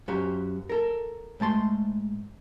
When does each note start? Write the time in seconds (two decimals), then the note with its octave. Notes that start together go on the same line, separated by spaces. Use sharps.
0.08 F#2 F#4 G4 C5 F5 A#5
0.69 A4 A#4
1.40 G#2 A3 A5 C6